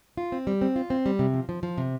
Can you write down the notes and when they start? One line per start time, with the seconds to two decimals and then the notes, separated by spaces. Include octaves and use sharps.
0.17 F4
0.32 C4
0.47 G3
0.62 C4
0.76 F4
0.90 C4
1.06 G3
1.19 C3
1.34 F3
1.49 F3
1.63 F3
1.78 C3